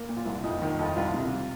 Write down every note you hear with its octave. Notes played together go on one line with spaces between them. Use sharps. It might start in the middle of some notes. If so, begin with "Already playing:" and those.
Already playing: A#3
A#2
F4
C2
F2 D#4
D#3
D#4
F2 F4
C2 F4
C3